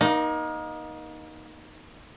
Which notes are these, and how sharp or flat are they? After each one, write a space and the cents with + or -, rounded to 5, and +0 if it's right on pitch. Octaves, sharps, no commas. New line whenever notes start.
A#3 +30 D#4 +0